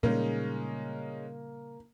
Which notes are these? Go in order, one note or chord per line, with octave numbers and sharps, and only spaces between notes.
A#2 C#3 G3 G#3 A#3 C#4 D#4